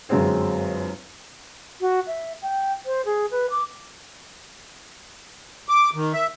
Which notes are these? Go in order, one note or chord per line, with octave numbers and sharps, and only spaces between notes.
G1 F#2 G#3 C4 G#4
F#4
E5
G5
C5
G#4
B4
D6
D6
D#3
E5